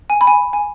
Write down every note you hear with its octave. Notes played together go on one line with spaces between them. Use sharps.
G#5
B5
G#5
G#5